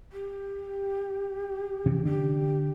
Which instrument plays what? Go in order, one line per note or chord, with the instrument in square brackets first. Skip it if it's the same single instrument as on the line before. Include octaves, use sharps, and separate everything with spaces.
[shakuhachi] G4
[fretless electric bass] C3 E3 C#4
[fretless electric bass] D3 D4 [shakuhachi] G4